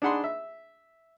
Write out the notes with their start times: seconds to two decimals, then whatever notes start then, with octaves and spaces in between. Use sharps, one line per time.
0.02 D4 D#4 G#4 F#5 B5 C6
0.24 E5